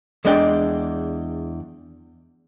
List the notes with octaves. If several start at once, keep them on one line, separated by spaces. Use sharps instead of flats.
E2 G#3 D4 D5 G5